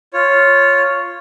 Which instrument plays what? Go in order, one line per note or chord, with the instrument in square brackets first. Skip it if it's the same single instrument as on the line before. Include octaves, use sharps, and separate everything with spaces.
[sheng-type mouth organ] F4 C#5